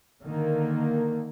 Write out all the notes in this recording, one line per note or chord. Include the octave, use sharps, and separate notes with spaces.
D3 D#3 A#3